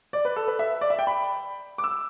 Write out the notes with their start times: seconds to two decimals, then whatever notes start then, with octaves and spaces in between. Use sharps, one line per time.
0.13 D5
0.25 B4
0.36 A4
0.47 B4
0.59 E5
0.81 D5
0.90 E5
0.99 G5
1.07 B5
1.78 D6
1.84 E6